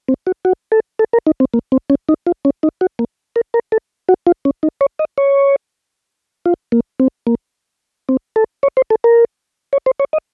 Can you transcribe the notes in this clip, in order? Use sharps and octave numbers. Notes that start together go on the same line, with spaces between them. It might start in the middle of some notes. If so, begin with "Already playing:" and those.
C4
F#4
F#4
A4
A4
A#4
D#4
C4
A#3
C4
C#4
D#4
F4
C#4
D#4
F#4
A#3
A#4
A#4
A4
F#4
F4
C#4
D#4
C#5
D#5
C#5
F4
A#3
C4
A#3
C4
A4
C#5
C5
A4
A#4
C#5
C5
C#5
D#5